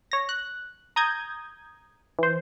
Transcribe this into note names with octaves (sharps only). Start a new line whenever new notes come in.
C#5 A#6
F#6
A#5 D#6 G6 G#6
E3 C5